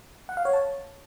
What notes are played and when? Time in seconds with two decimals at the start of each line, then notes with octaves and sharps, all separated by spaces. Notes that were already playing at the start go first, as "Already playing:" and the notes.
0.29 F#5
0.37 F5
0.45 C#5
0.53 A5